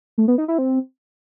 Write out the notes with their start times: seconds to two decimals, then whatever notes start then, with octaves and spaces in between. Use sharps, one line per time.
0.18 A3
0.28 B3
0.38 D#4
0.48 E4
0.58 C4